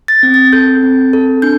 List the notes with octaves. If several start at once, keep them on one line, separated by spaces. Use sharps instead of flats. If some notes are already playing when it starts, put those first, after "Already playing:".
A6
C4
A6
A4 G6
C4
A4
D4 G6